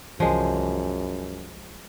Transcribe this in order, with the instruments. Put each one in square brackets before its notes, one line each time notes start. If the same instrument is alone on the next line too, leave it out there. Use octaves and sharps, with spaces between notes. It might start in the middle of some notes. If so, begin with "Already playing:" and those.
[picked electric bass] C2 E3 [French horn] F#2 [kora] F3 G#3